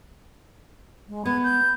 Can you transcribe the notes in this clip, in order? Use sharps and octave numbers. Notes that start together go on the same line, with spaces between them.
G#3
B3 B5 G#6
G6